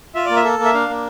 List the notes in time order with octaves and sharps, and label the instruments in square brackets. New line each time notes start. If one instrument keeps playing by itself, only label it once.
[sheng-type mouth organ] F4 E5
A#3 D5
E5
A4
A#3
E5
D4 F5
A#3